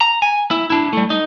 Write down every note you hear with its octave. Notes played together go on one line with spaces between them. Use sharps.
A#5
G#5
E4
D4 E4
G3 A3
D#4